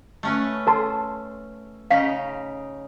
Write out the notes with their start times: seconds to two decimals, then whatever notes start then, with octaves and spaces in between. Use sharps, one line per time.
0.23 A3 C#4 B4
0.67 A4 A5 C6
1.91 C#3 D#4 F5 B6